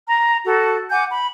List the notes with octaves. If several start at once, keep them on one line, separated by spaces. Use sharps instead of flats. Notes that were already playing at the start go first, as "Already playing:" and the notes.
A#5
F#4 A4
F#5 G#5 D6 G6
B5